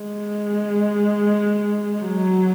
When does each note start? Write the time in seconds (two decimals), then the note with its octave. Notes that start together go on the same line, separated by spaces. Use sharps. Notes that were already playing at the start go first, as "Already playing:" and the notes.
Already playing: G#3
2.02 F#3